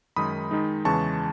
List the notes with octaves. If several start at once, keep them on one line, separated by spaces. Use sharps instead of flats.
F#2 D#3 G#3 D#4 B5 D#6
D#3 G#3 D#4
E2 C#3 E3 G#3 A5 C#6